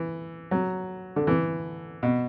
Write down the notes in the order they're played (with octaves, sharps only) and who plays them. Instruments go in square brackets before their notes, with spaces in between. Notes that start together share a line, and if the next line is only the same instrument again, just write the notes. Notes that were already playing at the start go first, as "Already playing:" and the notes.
Already playing: [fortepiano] E3
F#3
D3
E3
B2